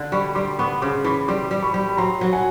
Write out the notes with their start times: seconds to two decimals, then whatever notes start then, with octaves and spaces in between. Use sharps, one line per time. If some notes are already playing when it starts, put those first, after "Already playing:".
Already playing: D3
0.12 G3 B5 C#6
0.35 G3 C6 D6
0.59 B3 B5 C#6
0.82 C#3 C6 D6
1.04 E3 B5 C#6
1.28 G3 C6 D6
1.51 G3
1.62 B5 C#6
1.74 G3
1.89 B5
1.97 F#3 A#5 C6
2.21 F#3
2.33 F#5 G#5